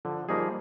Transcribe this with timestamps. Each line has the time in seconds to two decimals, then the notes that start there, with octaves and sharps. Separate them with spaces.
0.05 D3 F3
0.29 F3 G3 A#3 D#4 G#4